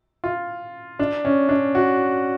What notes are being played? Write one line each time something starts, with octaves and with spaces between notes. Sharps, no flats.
F4
D4
C#4
D4
F#4